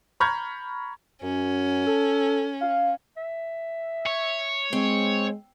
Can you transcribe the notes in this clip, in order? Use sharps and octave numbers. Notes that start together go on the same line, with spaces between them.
A#5 B5 C#6 F6 G6 G#6
F#2 C#4
A4
F5
E5
C#5
G#3 C4